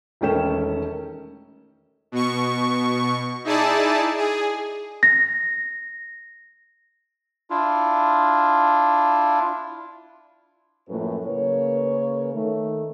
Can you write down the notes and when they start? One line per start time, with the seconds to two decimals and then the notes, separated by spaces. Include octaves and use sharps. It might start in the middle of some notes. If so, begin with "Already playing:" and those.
0.21 E1 D#3 A3 C#4 G5 E7
2.12 B2 C#6
3.44 D#4 E4 G#4 D5 A5
4.17 G#4
5.03 A#6
7.50 D4 E4 F4
10.89 F#2 A2 F3 A#3 A4 B4
11.25 C#3 A#3 A#4 B4 C#5
12.34 D#3 A3